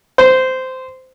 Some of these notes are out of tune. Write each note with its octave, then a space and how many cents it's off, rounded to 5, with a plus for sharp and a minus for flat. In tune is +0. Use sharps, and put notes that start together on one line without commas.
C5 -15